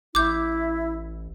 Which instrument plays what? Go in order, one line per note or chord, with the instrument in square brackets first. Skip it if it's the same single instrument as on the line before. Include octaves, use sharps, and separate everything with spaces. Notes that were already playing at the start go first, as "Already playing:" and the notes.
[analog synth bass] A1 [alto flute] E4 [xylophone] D6 G6